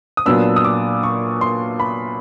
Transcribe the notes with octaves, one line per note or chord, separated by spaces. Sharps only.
D#6
A#2 F#3 B3 D4 E6
D#6
D6
C#6
C6
B5